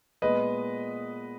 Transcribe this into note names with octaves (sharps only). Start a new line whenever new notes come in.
A#2 G#3 B3 B4 D#5